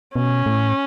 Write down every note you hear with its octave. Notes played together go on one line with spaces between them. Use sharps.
B2 C#4
A2